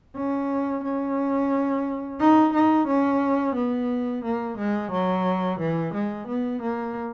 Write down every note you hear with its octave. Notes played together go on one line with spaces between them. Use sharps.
C#4
C#4
D#4
D#4
C#4
B3
A#3
G#3
F#3
E3
G#3
B3
A#3